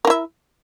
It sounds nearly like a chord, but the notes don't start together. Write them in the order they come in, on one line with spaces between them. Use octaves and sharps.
A#4 E4 E5